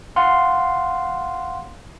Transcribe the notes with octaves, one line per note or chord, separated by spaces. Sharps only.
F5 F#5 C6